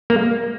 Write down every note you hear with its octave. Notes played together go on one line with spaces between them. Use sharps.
A#3